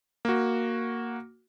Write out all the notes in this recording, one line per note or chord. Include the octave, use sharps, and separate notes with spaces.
A#3 F#4